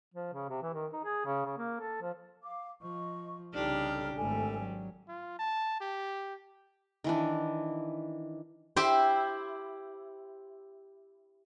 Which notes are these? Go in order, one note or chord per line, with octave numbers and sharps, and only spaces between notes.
F3
C#3
C3
E3
D#3
D#4
G#4
C#3
C#3
A#3
A4
F3
F5 D6
F3 D#5 C#6
C2 C#3 D4 D#4 G4 A4 F6
G#1 G3 A3 A4 G#5
F#3
F4
A5
G4
D#3 E3 D4
E4 G4 C5